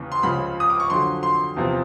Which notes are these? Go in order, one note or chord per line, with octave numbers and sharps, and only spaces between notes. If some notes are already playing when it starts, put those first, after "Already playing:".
Already playing: D#2 C#3 E3
C6
C#2 C#3 F3 B5
D#6
D6
C#6
F2 D3 F#3 C6
C6
E2 C3 F3